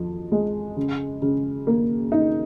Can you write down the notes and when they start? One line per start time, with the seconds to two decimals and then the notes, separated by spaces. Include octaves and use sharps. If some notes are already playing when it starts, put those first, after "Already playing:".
Already playing: F2 F3
0.32 G#3
0.77 C#3
1.22 C#3
1.67 A#3
2.12 D#4